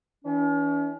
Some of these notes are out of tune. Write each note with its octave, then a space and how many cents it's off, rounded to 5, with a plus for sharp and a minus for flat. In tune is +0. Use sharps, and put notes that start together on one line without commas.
E3 -25 C#4 +45